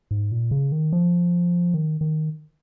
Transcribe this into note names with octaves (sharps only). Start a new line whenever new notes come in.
G#2
A#2
C#3
D#3
F3
D#3
D#3